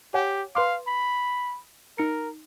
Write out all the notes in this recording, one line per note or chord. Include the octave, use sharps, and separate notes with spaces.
G4 C#5 F#5 G#5
B4 F5 C6 D6
B5
D#4 A#4 C#7